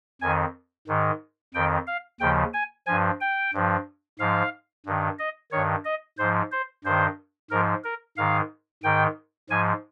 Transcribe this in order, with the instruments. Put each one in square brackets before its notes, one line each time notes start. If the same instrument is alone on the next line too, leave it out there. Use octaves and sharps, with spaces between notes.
[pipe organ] F2 D#3 G#5
G#2 D#3
F2 D#3 G5
F5
D#2 C#3 F3 G5
G#5
G2 F3 G#5
G5
G2 F3
G#2 F3 F5
G2 D#3
D#5
G2 D#3 C#5
D#5
G#2 F3 C5
C5
G2 D#3 C5
G#2 F3 A#4
A#4
G#2 D#3 F5
G#2 D#3 G5
G#2 F3 G#5